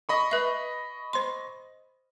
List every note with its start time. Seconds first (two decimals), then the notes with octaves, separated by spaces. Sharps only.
0.09 D#5 B5 C#6
0.31 B4 E5
1.13 C5 C6